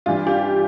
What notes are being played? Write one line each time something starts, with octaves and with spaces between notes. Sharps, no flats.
G2 E3 G3 F4
G4